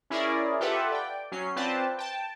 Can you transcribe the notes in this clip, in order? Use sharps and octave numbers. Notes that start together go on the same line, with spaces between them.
C#4 E4 G#4 A#4 D5
F4 G4 A4 B4 E5 F#5
D5 G5
F#3 C#4 C7
C4 F4 B4 C5 D5 A5
G5 A5